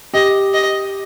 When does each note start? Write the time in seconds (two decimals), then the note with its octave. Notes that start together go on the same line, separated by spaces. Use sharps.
0.13 G4 D#5
0.53 D#5